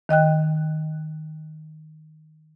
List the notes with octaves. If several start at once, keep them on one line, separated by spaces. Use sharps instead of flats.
D#3 D#5 G5 F#6